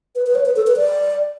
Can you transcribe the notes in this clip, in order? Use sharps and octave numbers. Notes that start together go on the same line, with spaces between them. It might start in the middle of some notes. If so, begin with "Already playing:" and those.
B4
B4
C#5
B4
A4
B4
D5